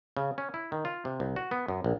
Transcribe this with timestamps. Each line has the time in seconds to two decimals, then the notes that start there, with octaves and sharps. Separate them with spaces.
0.17 C#3
0.38 C#4
0.54 E4
0.72 D#3
0.85 F4
1.05 C3
1.20 C2
1.36 F#4
1.51 B3
1.68 F#2
1.84 A#1